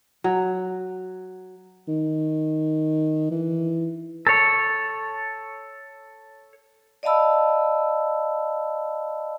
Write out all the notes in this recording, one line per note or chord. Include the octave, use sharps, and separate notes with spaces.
F#3
D#3
E3
A4 C#5
D5 D#5 F5 A5 B5 E6